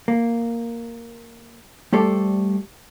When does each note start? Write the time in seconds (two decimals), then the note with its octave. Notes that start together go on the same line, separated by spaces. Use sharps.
0.08 A#3
1.93 G3 A3 G4 A4 C5 D5